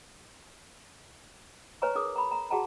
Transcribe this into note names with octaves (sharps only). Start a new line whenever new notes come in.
B4 C#5 G#5 A#5 C#6
D#4 G#4 A#4 D6 D#6
A#5 B5
A#5
F#4 G#4 F#5 A5 A#5